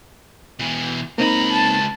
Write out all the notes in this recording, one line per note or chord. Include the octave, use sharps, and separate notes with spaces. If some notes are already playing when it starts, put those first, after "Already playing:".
B2 E3
C#2 A#3 C4 D#4 A#5 B5
A5